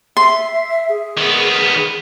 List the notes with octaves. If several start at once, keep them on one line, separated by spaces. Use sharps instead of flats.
E5 C6
G#4
D#3 B3